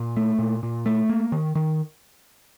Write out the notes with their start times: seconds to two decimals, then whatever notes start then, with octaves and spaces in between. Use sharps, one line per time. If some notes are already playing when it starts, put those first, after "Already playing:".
Already playing: A#2
0.17 A3
0.39 A#2
0.63 A#2
0.86 A3
1.09 A#3
1.32 D#3
1.55 D#3